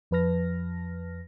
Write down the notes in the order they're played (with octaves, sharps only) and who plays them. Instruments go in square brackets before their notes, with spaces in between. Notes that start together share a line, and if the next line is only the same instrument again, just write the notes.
[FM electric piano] F2 F3 B4 A5 F6 A#6